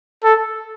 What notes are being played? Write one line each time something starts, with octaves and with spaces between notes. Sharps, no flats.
A4